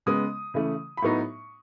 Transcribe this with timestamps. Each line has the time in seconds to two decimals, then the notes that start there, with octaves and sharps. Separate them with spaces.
0.06 C#3 G#3 B3 D#6
0.54 C#3 E3 A3
0.97 B5
1.02 A2 F#3 B3 D#4 C#6